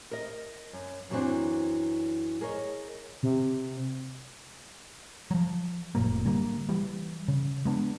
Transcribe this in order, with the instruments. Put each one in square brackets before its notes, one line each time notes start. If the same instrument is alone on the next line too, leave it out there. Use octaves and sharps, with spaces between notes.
[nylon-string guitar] A#4 D#5
F#2
F#2 E3 F#3 G3 C4 D4
G#4 A#4 C#5 D#5
[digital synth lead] C3
[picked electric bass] F3 F#3
F1 A2 F#3 A#3
D3 G3 A#3
E3 G3
C#3
G#3 B3 D4